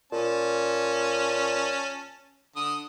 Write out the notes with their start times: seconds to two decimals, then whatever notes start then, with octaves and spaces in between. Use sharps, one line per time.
0.12 A#2 C#4 A5
2.56 D3 D#6